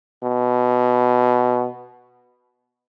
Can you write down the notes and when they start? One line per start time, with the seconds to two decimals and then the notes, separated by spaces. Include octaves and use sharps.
0.23 B2